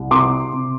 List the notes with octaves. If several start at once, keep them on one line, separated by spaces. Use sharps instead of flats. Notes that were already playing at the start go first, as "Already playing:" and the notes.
Already playing: C2
C3 C6 D6
C3